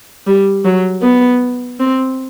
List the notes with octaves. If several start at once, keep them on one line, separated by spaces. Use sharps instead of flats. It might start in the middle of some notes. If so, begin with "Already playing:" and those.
G3
F#3
B3
C4